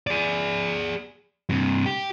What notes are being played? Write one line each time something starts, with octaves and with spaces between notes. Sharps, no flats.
G#4 D5
G2 C3
G4